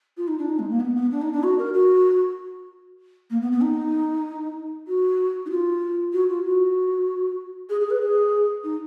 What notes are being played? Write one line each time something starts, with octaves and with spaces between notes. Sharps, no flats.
F4
D#4
D4
D#4
G#3
A#3
B3
B3
D4
D#4
D4
F#4
A#4
F#4
A#3
B3
B3
D#4
F#4
D#4
F4
F#4
F4
F#4
G#4
G#4
B4
G#4
D#4